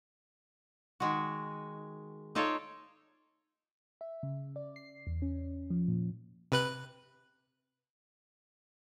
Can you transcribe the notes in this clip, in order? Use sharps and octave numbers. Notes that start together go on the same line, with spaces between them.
D#3 G#3 F#4
D#4 F4 A4 C#5 D5 F5
E5
C#3
D5
C7
E2
C#4
F3
A#2
C3 B4 F#6